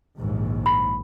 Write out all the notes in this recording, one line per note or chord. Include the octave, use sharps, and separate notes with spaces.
A#1 D#2 G#2
B5